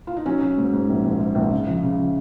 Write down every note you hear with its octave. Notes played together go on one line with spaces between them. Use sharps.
F4
D#4
F#3 C#4
F#3
G#2
G#2
A#1
A#1
G#2
A#1
C#3
F3
C#3
F3